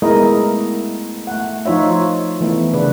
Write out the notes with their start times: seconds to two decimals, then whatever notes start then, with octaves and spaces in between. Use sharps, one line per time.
0.02 G#3 A3 B3 E4 A#4 D#5
1.27 A3 F#5
1.66 F3 D#4 F4 C#5 E5
2.41 E3 A3 B3
2.74 C#3 D4 B4